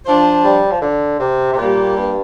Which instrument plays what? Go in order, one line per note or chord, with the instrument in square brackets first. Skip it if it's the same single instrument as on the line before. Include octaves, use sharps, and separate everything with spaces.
[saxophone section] F3 D4 F4 C5
[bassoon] G3
F3
D3
C3
C3
[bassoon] A#2 [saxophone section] G3 A#3 G4
[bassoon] G2